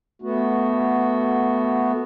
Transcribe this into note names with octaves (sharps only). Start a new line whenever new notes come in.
A3 B3 F#4